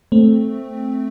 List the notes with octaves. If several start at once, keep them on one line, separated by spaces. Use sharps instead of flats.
A3 C4